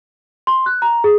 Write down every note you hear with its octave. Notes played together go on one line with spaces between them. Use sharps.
C6
F#6
A#5
G#4